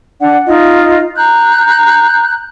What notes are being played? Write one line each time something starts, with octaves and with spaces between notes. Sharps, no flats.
D4 D5 F#5
D#4 F4 D#5
A#5 F#6 G6